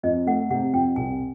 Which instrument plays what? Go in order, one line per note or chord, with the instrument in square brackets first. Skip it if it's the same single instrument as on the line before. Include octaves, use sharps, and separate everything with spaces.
[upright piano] F2 [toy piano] D#5
[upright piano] A3 [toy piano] F#5
[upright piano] C3 [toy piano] F#5
[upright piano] F2 [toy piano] G5
[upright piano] C2 [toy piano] G#5